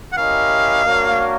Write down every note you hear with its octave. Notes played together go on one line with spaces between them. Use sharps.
F#5
C#4 E4 G4 A#4 D#5 F5
A#3 D4 F#4 A#4 C#5